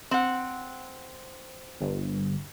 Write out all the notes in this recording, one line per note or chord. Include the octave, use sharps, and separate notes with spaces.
C4 F#5
G1